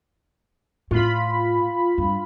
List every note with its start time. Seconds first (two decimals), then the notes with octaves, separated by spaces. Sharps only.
0.91 A2 F4 B5
1.98 G2